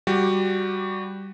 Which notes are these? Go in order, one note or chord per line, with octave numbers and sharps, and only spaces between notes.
G3 F#4 G4